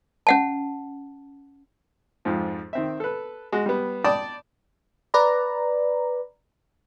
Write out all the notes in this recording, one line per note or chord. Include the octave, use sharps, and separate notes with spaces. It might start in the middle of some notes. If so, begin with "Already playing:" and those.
C#4 F#5 A5
F2 G#2 F3
D#3 C4 E5
A4 B4
G#3 F#4
G3 B3
D5 G5 A5 B5 D6 D#6
B4 D5 A#5